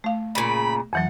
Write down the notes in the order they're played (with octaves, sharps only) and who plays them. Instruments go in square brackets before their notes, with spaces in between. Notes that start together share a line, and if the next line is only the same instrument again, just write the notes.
[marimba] A3 F5
[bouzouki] A#2 C#3 [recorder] B5
[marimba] F2 E3 F#3 [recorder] F#5